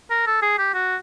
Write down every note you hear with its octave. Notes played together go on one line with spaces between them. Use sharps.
A#4
A4
G#4
G4
F#4